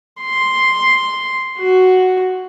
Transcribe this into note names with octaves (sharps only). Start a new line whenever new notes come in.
C6
F#4